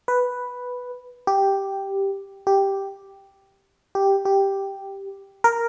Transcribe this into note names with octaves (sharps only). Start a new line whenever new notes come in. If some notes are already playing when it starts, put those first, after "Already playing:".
B4
G4
G4
G4
G4
A#4